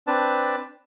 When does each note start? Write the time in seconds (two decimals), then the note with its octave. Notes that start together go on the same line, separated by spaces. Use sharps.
0.07 C4 D4 B4 A5